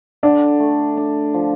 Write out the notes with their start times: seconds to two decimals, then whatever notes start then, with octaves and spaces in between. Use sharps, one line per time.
0.23 D3 D4
0.60 A3
0.97 D4
1.34 F3